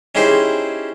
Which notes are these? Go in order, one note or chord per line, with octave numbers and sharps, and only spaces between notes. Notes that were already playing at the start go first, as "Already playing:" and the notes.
C#4 D#4 E4 G4 G#4 C5